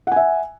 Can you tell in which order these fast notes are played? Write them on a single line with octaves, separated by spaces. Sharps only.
F#5 G#5 E5